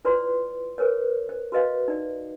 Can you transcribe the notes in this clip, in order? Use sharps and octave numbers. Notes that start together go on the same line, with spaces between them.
E4 F4 B4 C5 D5 C6
G#4 A#4 B4 C#5
C5
F#4 B4 D#5 F5
D#4 D5